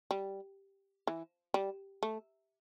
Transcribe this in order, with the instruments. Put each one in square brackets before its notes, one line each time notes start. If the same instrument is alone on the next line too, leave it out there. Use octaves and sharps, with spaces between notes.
[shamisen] G3
E3
G3
A3